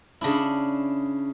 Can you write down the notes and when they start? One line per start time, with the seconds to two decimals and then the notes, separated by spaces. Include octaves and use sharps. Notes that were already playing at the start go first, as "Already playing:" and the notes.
0.21 C#3 D4 E4